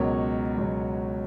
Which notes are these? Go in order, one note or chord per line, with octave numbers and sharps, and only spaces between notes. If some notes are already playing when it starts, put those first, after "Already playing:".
Already playing: C#2 B2 F#3 A#4 C#5
C#2 B2 F#3